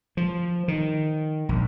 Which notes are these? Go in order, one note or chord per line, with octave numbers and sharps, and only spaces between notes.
F3
D#3
A#1